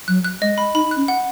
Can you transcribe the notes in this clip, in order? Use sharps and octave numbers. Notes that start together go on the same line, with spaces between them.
F#3 F#6
F#6
G#3 D#5
B5
D#4 B5
F#6
C#4
F#5